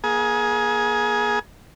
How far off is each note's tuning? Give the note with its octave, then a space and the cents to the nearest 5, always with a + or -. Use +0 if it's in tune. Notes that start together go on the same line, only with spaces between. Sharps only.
A#3 +40 G#4 +15